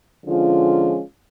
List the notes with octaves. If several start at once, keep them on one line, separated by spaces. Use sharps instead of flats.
D3 F3 G#3 C#4 F4